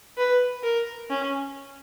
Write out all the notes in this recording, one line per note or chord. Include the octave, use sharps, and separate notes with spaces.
B4
A#4
C#4